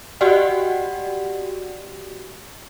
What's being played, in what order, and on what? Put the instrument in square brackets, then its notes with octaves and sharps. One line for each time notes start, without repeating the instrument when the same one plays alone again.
[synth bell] F#4 G4 D5 D#5 F#5 G5